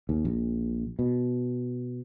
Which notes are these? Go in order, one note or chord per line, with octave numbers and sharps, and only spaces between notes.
D#2
A#1
B2